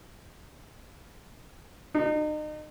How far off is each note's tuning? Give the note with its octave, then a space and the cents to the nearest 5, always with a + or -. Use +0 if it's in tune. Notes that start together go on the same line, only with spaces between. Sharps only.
D#4 -35